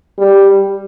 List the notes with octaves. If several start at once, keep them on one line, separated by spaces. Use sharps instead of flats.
G3